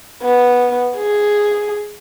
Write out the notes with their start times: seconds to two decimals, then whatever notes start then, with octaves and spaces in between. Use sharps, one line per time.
0.23 B3
0.97 G#4